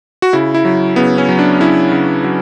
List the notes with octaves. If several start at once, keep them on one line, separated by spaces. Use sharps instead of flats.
F#4
C#3 E4
E4
F#3
C#3 B3
C#4
F#3
D4
C#3 E4
C#3
F#3